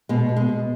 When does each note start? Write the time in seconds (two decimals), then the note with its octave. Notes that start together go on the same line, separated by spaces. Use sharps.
0.09 B2 G#3
0.29 B2
0.36 G#3
0.48 B2